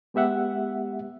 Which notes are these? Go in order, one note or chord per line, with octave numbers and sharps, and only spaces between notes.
G#3 B3 G4 E5 F#5